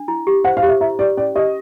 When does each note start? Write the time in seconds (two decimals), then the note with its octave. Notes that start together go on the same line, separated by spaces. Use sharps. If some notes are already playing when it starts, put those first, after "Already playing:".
Already playing: D4
0.08 E4
0.27 G4
0.44 C5 F#5
0.57 F5
0.63 G4
0.69 E5
0.81 E4 E5
0.99 G4 D5
1.17 C#4 D5
1.35 G4 D#5